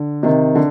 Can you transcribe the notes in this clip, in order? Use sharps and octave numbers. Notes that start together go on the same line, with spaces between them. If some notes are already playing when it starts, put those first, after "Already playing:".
Already playing: D3
C3 D#3
D3